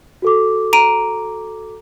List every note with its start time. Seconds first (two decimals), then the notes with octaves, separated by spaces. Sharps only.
0.22 F#4 A4 D6
0.73 A#5 D7 D#7